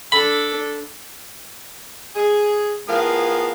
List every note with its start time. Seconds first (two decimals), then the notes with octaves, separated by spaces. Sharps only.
0.12 D4 A4 B5
2.15 G#4
2.88 A2 F3 B3 G#4 A#4 F5